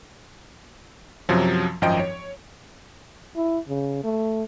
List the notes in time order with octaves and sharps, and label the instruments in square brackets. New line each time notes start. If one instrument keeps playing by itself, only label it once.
[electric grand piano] F#2 C3 F3 F#3
G#1 F#2 F3 D#5 G5 D7
C#5
[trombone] E4
C#3
A3